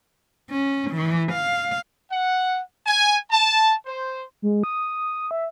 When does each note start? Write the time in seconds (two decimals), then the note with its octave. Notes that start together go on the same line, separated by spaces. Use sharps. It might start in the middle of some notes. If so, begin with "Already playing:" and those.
0.50 C#4
0.91 E3
1.32 F5
2.10 F#5
2.86 G#5
3.31 A5
3.86 C5
4.42 G#3
4.64 D#6
5.31 E5